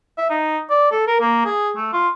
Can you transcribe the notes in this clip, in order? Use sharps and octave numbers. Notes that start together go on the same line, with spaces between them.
E5
D#4
D5
A4
A#4
A#3
G#4
A3
F4